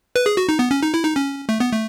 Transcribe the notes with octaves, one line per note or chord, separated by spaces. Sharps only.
B4
G#4
F#4
D#4
B3
C#4
D#4
E4
D#4
C#4
A3
B3
A3